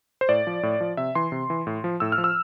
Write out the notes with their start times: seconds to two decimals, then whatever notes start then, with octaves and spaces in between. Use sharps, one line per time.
0.21 C5
0.29 A2 D5
0.47 F3
0.63 A2
0.81 F3
0.97 C3 E5
1.15 E3 C6
1.32 C3
1.50 E3
1.67 A2
1.84 F3
2.00 A2 E6
2.12 F6
2.18 F3
2.24 E6